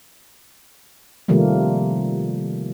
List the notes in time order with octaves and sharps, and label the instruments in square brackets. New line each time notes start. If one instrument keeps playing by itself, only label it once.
[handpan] C3 D#3 F3 G3 A3 A#3